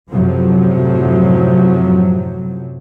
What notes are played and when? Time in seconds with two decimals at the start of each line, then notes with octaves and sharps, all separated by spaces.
0.11 F#2 A2 C3 F3 F#3